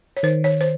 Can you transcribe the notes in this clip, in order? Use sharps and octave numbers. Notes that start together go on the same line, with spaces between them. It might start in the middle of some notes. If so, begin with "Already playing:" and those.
C#5
D#3 C5
C#5
C5